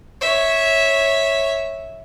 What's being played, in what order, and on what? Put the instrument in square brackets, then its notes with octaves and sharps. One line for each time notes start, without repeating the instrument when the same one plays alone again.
[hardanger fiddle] C#5 E5